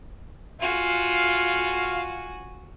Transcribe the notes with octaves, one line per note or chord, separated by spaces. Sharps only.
F4 F#4 F5 G#5